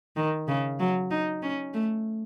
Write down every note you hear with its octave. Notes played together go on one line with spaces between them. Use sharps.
D#3
C#3
F#3
D#4
C#4
A3